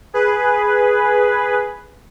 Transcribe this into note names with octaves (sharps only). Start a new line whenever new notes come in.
G#4 B4